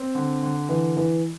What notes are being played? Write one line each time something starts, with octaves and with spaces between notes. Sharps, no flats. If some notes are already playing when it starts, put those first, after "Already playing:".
Already playing: C4
D3
D3
E3
E3